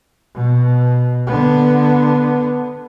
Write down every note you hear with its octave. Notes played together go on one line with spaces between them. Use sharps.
B2
D3 B3